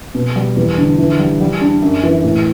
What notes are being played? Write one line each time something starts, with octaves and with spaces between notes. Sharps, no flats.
B2
G3
E2
D3
E3
G3
G3
D4
F#2
E3
A2